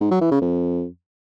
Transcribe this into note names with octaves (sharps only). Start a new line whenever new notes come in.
G#2
F#3
E3
C#3
F2